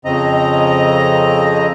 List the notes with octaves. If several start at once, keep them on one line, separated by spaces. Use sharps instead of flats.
F2 C#3 C4 D#5 A#5